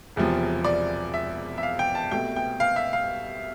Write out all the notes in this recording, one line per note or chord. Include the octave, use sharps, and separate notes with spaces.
E1 E2 C3 F3
D5
E5
E5
F5
G5
A5
C2 B2 A3 G5
G5
F5
E5
F5